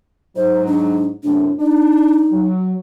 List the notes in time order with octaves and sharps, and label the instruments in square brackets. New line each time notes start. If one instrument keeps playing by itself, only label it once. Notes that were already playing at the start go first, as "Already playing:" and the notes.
[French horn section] G#2 F#3 D#4 [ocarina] C5
[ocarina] D4
[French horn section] F#2 A2 C3 [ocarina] D4
[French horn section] D4 [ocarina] D#4
[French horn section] F#3